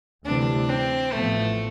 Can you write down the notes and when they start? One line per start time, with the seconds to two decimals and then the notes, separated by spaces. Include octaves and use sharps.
0.25 D2 C3 E3 G3 C4 D4
0.69 C4
1.12 A1 A2 F3 A3 B3